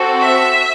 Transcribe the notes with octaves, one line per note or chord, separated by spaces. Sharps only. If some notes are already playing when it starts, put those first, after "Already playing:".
Already playing: C4 F#4 A4
E5